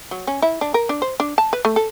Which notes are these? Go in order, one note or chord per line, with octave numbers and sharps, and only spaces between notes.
F#3
C#4
E4
D4
A#4
D4
C5
D4
A5
B4
A3
A4